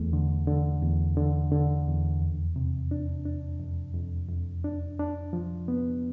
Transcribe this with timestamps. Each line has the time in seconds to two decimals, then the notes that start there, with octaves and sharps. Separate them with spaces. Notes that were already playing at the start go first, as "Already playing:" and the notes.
Already playing: E2 A3
0.13 D3
0.47 D3
0.83 E2
1.17 D3
1.52 D3
1.87 E2
2.22 F2
2.56 C3
2.91 D4
3.25 D4
3.60 F2
3.94 F2
4.29 F2
4.64 D4
4.99 D4
5.33 F3
5.68 B3